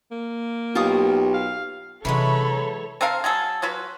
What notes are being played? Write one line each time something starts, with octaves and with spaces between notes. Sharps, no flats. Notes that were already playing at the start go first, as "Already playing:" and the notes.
A#3
B1 F4 G4 C#6 D#6
F5
C3 E3 F#3 G#3 D4 A4 C#5 B5
C4 A4 A#4 F5
F#3 G#4 A4
F#3 F4 F#4 B4